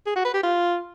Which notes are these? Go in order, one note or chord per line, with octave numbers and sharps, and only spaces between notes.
G#4
F#4
B4
G4
F4